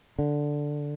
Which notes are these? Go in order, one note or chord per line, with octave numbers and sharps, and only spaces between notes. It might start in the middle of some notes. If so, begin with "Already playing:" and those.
D3